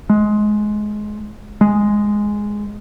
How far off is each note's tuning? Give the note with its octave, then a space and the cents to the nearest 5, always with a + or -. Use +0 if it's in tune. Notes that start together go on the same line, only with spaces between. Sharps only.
G#3 +20
G#3 +0